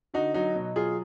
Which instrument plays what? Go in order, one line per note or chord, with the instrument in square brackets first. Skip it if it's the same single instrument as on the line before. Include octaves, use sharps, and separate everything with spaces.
[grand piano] D3 D#4 F#4
F#3 D#4 F#4
B2
F#3 F4 G#4